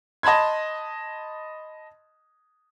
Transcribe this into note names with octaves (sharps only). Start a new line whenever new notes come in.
D#5 A5 B5 C6 G#6